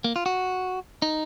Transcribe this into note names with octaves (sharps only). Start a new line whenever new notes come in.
A#3
F4
F#4
D#4